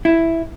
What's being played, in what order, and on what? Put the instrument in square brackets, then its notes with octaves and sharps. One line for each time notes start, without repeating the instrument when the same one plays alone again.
[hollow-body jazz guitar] E4